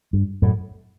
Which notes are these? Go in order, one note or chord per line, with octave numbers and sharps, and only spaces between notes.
G2
F#2 A2